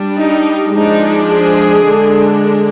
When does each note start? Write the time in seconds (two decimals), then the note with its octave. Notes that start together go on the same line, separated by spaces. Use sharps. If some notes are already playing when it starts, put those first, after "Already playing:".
Already playing: G3 D4
0.18 D#4
0.74 F3 G#3 D4 D#4
1.31 G#4
1.87 D3 G#3 D4